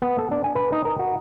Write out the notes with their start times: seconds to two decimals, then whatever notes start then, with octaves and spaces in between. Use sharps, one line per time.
0.02 B3
0.18 A4
0.31 D4
0.44 G#5
0.55 B4
0.72 D#4
0.85 A#4
0.99 F#4